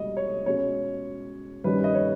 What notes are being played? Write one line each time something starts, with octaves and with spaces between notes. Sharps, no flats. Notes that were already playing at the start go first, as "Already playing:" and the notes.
Already playing: C#2 B2 G3 D#5
C#5
B2 G#3 C#4 C#5
G2 D#3 G3 C#4 B4
D#5
C#5